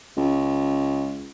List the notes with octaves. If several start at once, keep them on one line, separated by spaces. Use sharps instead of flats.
C#2